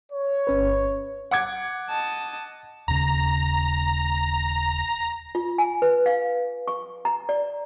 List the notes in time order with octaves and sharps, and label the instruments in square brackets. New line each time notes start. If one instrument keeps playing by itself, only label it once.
[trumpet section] C#5
[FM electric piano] G1 C#4 B4
[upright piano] F#5 D6 G#6
[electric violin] D#5 A5
[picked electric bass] D#1 D#2 C#3 [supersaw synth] A#5
[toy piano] F4
G#5
B4
F5
C#6
A#5
D5